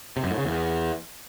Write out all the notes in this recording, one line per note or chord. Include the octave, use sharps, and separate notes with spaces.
C3
F#2
A2
C#3
E2